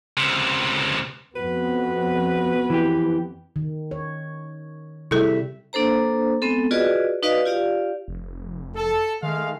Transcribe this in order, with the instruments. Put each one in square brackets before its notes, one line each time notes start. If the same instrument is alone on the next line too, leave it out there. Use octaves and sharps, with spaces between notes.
[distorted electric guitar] C#2 C3
[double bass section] F2 B3 [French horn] F#4 [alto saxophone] B4
[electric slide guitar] E3 G4
[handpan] D#3
C#5
[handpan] C3 G3 E5 [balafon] E4 G#4 A4
[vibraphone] A#3 D4 A4 C5 A#5
G#3 B3 C4 A4
F4 F#4 G#4 B4 D5 D#5
D#4 F#4 B4 D5 D#5 F5
F4 G4 D5 F5
[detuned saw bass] F1
[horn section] A4
[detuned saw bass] D#3 [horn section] G#3 A3 F5